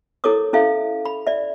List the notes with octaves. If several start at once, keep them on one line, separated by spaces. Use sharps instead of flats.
E4 A4 A#4 C#5 D6 D#6
C#4 E4 A4 E5 F5
B5
D5 E5